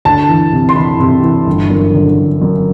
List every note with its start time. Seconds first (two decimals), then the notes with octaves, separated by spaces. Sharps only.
0.05 D2 A5
0.29 E3
0.52 C3
0.69 C6
0.76 E3 B5
1.00 C3
1.23 E3
1.47 G1
1.70 F#2
1.94 D3
2.18 G1
2.42 F#2